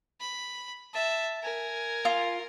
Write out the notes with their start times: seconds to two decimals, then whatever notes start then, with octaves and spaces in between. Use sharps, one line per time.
0.20 B5
0.93 E5 A5
1.43 A#4 G#5
2.05 F4